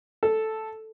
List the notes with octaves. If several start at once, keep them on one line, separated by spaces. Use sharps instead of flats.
A4